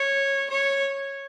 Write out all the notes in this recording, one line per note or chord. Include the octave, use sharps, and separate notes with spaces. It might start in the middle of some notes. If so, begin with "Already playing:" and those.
Already playing: C#5
C#5